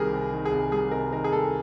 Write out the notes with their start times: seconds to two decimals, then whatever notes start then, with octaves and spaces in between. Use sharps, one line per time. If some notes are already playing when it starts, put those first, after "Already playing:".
Already playing: C2 C3 D#3 G3 G#4 A#4
0.12 C3
0.31 D#3
0.45 G#4
0.51 C2
0.71 G3 G#4
0.91 C3 A#4
1.13 D#3 A#4
1.24 G#4
1.32 C2 A4